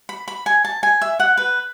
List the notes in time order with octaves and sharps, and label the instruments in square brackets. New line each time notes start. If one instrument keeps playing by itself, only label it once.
[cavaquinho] B5
B5
G#5
A5
G#5
E5
F#5
B4